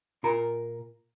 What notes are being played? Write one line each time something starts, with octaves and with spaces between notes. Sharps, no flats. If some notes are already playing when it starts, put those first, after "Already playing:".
A#2 F4 A#4 A#5